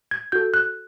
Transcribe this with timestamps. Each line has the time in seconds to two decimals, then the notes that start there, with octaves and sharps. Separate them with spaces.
0.11 G#6
0.32 F#4 A4 G6
0.54 F#6